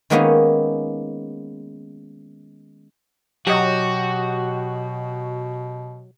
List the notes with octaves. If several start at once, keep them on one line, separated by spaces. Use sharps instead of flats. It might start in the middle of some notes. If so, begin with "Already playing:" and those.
D#3 G#3 A#3 B3 C#4 D#4
B2 F#3 F#4 G4 D#5